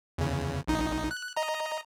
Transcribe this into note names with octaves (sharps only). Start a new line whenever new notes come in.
E2 C#3
A#1 D#4
F#6
D#5 A#5